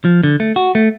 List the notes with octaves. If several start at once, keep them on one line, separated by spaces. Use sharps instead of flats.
F3
D3
A3
F#4
A3